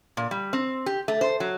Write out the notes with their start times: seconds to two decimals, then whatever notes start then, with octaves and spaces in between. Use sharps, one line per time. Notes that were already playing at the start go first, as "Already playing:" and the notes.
0.17 A#2
0.31 G3
0.53 C4
0.86 G4
1.08 A3
1.21 C5
1.40 F#3